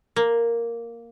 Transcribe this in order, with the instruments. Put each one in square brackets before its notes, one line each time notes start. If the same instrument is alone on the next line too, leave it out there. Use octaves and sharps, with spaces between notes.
[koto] A#3